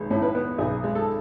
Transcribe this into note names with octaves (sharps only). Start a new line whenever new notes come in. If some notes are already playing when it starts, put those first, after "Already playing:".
Already playing: B1 G#3
A2
B4
B3
B1 G#4
G#3
A4